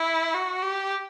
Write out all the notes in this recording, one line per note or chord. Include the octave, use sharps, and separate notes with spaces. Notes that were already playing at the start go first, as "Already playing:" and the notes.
Already playing: E4
F#4
G4